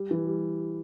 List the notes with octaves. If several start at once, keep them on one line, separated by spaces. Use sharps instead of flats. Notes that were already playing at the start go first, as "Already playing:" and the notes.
Already playing: G3
E3
G3